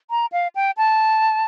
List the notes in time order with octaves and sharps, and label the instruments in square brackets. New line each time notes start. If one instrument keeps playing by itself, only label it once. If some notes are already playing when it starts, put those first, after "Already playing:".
[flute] A#5
F5
G5
A5